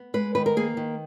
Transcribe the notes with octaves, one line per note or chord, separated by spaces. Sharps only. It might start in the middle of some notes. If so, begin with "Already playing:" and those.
Already playing: B3
G#3 B4
D#3 B4
A#4
A#3 G#4
D#3